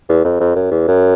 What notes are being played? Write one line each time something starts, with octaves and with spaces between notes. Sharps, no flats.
E2
F2
F2
F#2
E2
F#2